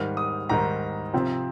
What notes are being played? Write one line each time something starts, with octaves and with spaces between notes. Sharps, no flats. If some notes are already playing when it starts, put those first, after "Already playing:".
Already playing: G#2 D#3 G3 F6
D#6
G#2 D#3 G3 A#5
C3 F3 C4